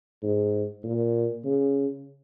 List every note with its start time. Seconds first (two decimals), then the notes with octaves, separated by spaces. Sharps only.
0.23 G#2
0.84 A#2
1.44 C#3